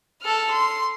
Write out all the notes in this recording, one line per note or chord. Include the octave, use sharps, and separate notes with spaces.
A4 F6
C6